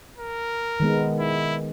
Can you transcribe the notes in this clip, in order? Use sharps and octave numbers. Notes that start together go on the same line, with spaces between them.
A#4
D#3 G#3 B3
E4